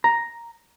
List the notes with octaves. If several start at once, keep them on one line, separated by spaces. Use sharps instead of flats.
A#5